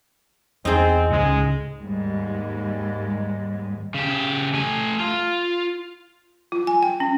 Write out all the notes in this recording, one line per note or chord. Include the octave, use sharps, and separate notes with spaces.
E2 C4 D#4 G#4
C#2 A2 G#3
D#2 G#2 G3 G#3
C#3 G4
A3 G#5
F4
F4
G#5
G5
C#4